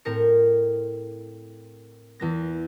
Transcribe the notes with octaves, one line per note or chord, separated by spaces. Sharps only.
A2 C4 A#4 A#6 C#7
E2 B3 A#6